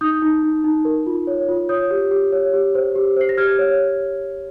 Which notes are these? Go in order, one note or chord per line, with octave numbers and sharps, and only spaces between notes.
D#4 D#6 G6
D#4
D#4
D#4
A#4
F4
C#5
F4
C#5 D#6 G6
G4
G4
C#5
G4
C5
G4
C5 C7
A#6
G4 F6 G#6
C#5